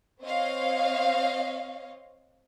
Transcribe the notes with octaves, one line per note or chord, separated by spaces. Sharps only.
C4 C#5 D#5 F5